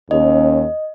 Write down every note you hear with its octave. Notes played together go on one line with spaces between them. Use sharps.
D#2 C#4 D#5